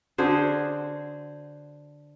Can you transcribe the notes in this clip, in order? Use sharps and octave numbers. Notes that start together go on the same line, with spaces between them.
D3 F#4 G#4 C5